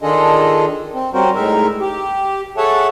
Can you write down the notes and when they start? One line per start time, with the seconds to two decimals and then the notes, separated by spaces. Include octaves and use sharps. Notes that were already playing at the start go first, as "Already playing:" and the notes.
0.02 D#3 D4 F4 G#4 A4 D#5
0.94 C4
1.14 G3 C4 C#4 F#4 A#4 C5
1.35 A2 G#3 D#4 A#4 E5
1.81 G4
2.57 G#4 A4 C#5 E5 F#5 A5